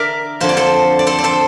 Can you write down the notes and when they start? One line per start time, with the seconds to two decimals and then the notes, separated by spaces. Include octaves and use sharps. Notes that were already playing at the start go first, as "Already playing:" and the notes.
Already playing: D3 A#4 D5 E5
0.40 F2 D3 F3 C5
0.49 D5
0.57 A4 C5
0.99 D5
1.07 A4 C5
1.18 D5
1.24 A4 C5